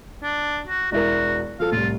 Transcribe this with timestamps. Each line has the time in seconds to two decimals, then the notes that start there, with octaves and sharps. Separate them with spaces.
0.23 D4
0.65 F#4
0.92 E1 E4 F#4 A#4
1.60 F3 A4 F5
1.72 C2 A2 F4